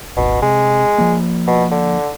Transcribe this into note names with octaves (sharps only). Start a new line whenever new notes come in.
D#1 G#1 B2
C3 G#3
F3 A#3
B2
D3